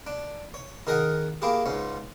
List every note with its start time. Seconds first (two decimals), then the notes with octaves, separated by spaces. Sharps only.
0.07 D4
0.54 C#5
0.87 D#3 G#4 A#4 D#5 F#5
1.42 A#3 E4 G4 G#4
1.66 C#2 G#2 C#4